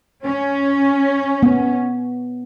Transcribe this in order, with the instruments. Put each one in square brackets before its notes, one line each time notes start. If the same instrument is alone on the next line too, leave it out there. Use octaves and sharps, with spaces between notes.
[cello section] C#4
[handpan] B3